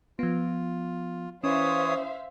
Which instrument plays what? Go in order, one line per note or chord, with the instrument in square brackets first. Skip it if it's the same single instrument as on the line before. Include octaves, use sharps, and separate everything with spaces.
[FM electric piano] F3 B3 [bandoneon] F4
[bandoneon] E3 C#5 D#6 [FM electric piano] C#4 [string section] C5 E5 F5